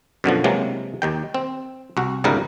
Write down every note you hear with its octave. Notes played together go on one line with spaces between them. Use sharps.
F#2 B2 D3 F3
C3 E3 F#3 G#3 A#3
D#2 D#3 G5
C4
C2 F#4
G1 C#2 G#2 C3 G3 A#4